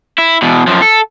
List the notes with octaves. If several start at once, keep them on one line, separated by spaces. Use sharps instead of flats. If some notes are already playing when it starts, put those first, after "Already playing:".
E4
E2 B2
F#2 F3
A4